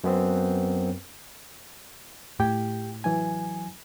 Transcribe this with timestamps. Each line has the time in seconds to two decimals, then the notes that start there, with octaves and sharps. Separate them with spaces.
0.04 F#2 B3 C4
2.40 A2 G4 G5
3.04 E3 F#3 G#5